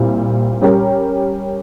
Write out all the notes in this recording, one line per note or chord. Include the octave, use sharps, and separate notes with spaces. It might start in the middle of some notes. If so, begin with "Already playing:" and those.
Already playing: A#2 G3 C4 E4
G3 C#4 G4 A#4